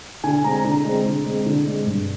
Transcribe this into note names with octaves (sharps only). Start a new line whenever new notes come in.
D3 G#5
G#3 C4 A#5
D3 A#5
G#3 C4
D3
G#3 C4
D3
G#3 C4
G2